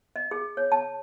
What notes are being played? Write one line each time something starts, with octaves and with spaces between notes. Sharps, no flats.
D#5
G#4
C#5
A5